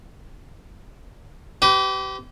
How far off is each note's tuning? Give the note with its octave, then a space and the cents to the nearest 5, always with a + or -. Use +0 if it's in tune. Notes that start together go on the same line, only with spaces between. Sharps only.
G4 -30 B4 +40